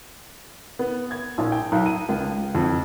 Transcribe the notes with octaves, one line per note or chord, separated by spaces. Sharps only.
B3
G#6
A#1
G5
B1
D#7
C#2
F2